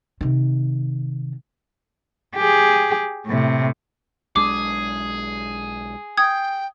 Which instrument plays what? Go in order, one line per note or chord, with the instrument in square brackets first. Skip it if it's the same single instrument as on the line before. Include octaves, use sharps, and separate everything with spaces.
[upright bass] C3 D#3
[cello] G4 G#4
A2 C3
[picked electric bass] B1 G#3 D4 [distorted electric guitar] G#4 [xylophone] D6
[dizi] G5 [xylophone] D#6 G#6